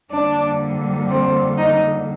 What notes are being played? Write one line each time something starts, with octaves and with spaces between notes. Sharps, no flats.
F2 D3 G3 A#3 D4
C4
D#4